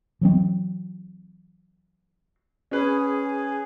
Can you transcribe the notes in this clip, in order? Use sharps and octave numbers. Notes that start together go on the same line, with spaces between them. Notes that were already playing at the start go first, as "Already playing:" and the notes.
E3 F#3 C4
C#4 G#4 B4